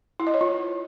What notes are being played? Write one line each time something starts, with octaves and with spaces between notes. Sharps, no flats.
E4
D#5
C#5
F4